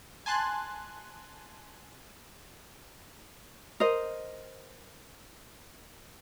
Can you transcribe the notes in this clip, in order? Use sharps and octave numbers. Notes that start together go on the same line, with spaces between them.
G#5 A5 C6 F#6 A6
A#4 C5 D#5